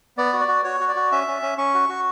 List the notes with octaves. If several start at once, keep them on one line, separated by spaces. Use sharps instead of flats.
B3 D5
F#4
D5
F#4
F#4 C#5
F#4
D5
F#4
C#4 E5
C#4
C#4
C#4 C#6
F#4
F#4